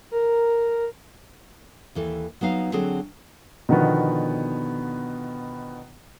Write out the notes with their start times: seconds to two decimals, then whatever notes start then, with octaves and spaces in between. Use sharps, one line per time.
0.11 A#4
1.95 D#2 E3 A4
2.41 F#3 B3 D#4 F5
2.72 D3 F#3 C4 G#4 A4
3.69 B2 D3 D#3 F3 B3